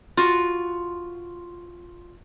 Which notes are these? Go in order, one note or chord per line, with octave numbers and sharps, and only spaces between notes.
F4 F#4